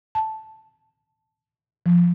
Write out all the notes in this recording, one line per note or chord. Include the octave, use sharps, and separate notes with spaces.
A5
F3